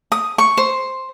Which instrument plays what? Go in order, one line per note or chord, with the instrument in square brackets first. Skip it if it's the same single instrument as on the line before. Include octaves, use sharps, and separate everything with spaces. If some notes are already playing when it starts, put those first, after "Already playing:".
[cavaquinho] D#6
C#6
C5